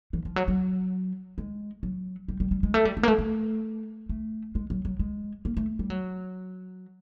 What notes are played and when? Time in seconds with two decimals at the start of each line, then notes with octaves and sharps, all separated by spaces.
0.13 E3
0.25 F3
0.36 F#3
0.48 F#3
1.38 G#3
1.83 F#3
2.28 G3
2.40 G3
2.51 G3
2.63 G#3
2.74 A3
2.85 G3
2.97 G#3
3.03 A#3
3.08 A3
3.18 A3
4.09 A3
4.55 G#3
4.70 F#3
4.85 F#3
4.99 G#3
5.45 A#3
5.57 A3
5.79 G3
5.90 F#3